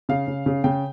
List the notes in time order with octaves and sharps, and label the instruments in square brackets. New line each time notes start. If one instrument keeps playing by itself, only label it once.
[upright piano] C#3 F5
C#3
C#3
C#3 G5